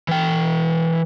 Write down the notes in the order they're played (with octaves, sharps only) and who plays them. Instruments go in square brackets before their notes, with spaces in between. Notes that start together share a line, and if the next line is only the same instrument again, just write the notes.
[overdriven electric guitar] E3 G5